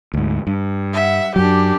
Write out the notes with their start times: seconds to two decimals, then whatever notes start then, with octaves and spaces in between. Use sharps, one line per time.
0.14 D2 G#2
0.47 G2
0.93 E5 F#5
1.36 F#2 F#3 D4 G4